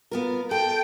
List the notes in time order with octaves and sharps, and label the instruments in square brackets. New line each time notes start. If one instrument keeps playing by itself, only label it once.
[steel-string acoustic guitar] B3 F4 A#4
[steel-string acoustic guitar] A4 [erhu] G5